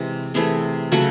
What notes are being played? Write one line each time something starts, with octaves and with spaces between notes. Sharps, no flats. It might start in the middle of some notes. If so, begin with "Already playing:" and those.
Already playing: C3 E3 G#3
C3 E3 A3 G#4
C#3 F#3 A3 F#4